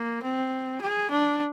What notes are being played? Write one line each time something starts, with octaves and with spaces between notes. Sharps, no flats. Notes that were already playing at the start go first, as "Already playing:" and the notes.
Already playing: A#3
C4
G#4
D4